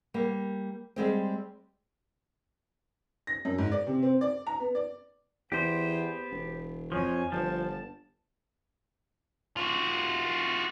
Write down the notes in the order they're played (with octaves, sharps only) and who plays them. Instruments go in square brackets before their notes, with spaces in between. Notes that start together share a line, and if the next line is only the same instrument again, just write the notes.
[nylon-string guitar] G3 A#3
G3 G#3 C4
[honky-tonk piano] A#6
F#2
G#2
D5
C3
C4
D5
A#5
B3
D5
[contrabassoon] E2 [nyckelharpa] B3 [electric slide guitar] G4 C5
[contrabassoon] E1
[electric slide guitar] F2 F3 [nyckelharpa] C#5 G#5
[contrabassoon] G1 [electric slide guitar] F3 [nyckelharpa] A5
[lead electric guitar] F4 F#4